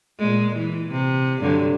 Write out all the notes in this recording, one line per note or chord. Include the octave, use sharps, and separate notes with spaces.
A#2 G#3
E3
C3
G2 D3 F#3